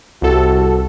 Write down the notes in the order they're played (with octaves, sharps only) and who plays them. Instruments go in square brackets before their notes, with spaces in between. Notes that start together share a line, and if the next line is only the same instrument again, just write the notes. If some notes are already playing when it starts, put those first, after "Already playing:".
[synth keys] C2 A4 [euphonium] F#4